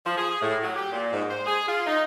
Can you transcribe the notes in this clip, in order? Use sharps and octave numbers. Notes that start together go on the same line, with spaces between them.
F3
G#4
A2
F#3
G4
A#2
G#2
C5
G#4
F4
D#4